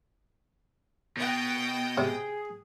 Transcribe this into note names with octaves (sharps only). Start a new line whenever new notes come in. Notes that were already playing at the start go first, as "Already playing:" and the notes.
B2 G5 D#6
C3 G#4